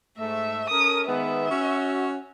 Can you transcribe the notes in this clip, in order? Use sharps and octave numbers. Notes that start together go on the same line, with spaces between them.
G#2 A3 E5
C#4 A4 A#4 D#6
D#3 G#3 B3 E5
C#4 F#4